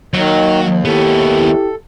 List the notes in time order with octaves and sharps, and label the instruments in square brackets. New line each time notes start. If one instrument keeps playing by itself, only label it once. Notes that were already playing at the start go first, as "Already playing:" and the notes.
[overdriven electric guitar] D#2 [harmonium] D#3 [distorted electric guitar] F#3
[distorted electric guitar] B3 C#4 [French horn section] E4 G4 [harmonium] A4